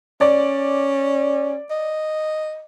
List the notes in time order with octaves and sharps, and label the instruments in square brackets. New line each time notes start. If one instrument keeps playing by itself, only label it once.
[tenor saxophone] C#4 [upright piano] D5
[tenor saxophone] D#5